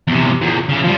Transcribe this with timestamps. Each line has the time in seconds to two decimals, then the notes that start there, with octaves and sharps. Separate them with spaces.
0.08 E2 C3
0.41 E2 A#2
0.69 C#3 E3
0.84 F3 G3